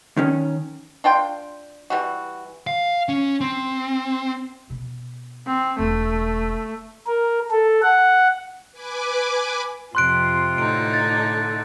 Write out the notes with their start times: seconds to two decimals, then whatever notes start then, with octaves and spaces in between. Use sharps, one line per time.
0.17 D#3 C#4
1.04 D4 F4 G5 C6
1.90 E3 G3 F#4
2.67 F5
3.09 C#4
3.41 C4
4.70 B2
5.47 C4
5.79 E1 A3
7.07 A#4
7.51 A4
7.82 F#5
8.72 B4 G#5 D6
9.95 F2 C3 F4 C6 F#6 D7
10.58 A2 D3 D#4 D7
10.93 A6